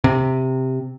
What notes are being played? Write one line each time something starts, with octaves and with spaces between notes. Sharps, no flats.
C3